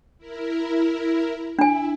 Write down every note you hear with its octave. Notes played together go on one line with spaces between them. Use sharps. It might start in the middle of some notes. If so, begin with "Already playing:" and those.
E4 A#4
D4 E4 G#5